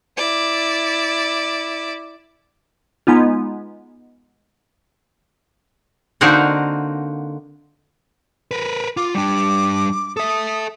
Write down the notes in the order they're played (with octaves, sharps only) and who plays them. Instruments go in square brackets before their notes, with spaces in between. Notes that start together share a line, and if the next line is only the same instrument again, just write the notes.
[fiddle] E4 D5
[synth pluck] G#3 B3 D#4 F4
[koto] D3 A#3 C4 D#4 F#4
[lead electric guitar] A#4 B4
[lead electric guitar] F4 [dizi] D6
[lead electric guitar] G3 D4 [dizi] D6
[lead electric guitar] A4 E5 [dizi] D#6